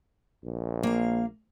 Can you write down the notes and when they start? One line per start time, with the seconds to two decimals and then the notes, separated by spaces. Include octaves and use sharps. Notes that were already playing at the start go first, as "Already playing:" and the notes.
0.45 A#1
0.83 A#3 F5